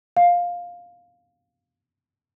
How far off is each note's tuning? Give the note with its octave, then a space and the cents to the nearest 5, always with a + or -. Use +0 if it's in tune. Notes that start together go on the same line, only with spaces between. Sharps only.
F5 +10